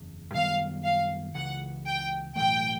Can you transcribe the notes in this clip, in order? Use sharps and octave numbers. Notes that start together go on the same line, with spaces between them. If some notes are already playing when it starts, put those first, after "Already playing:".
Already playing: F#1 E2 C#3
F#2 D#3 G3 B3 F5
F5
C#2 C#3 E3 F#5
G5
B1 A2 E3 A3 G5